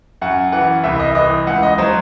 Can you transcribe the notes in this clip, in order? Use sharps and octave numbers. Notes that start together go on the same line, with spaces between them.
F#2 F#5
E3 F#5
C2 E5
D#5
E3 D#5
C#2 F#5
D#5
F#3 C5